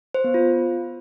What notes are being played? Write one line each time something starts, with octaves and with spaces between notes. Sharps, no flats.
C5
B3
F4